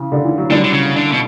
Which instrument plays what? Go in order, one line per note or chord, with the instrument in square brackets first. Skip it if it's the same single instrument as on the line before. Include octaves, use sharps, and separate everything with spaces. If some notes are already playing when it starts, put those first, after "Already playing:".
Already playing: [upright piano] C#3 E3
D3
E3
F#3
[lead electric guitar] D3 [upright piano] E3 G3
[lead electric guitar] D3
C#3
D3
B2